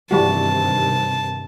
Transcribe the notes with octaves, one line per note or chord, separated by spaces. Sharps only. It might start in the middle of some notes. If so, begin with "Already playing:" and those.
G2 C3 D#3 E3 G3 F#4 A5